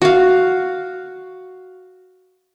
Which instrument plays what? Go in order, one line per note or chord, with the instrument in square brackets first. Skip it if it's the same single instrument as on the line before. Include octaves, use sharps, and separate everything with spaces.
[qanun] F#4 F5